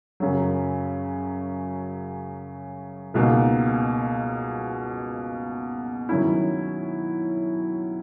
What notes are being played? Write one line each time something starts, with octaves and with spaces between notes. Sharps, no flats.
F#2 C#3 F#3
C#2 B2 A#3 D#4
D#3 F#3 C#4 E4